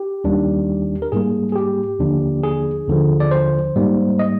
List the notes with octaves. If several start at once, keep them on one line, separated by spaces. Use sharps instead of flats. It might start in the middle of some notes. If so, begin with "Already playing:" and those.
Already playing: G4
D#2 D#3 G3 D4
A#4
G#2 G3 A#3 G#4
G#4
G4
D#2 D3 F3 A#3 D4
G#4
D#2 D3 F3
D5
C5
G#2 G3 A#3
D#5